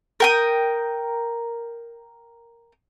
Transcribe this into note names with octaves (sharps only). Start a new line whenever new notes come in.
A#4 G5 D#6